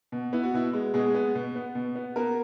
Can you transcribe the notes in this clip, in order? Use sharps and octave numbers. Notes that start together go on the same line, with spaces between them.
B2
B3 E4
F#4
B2 E4
G#3
B2 G#3 G#4
B3
B2
B3
B2
B3
A#3 B3 A#4